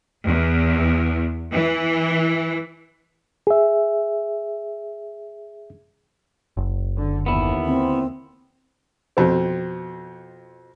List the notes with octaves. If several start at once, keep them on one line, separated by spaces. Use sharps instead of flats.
E2
E3
G#4 E5
F#1
D3
D#2 D3 B3 E4
C4
F2 B2 C4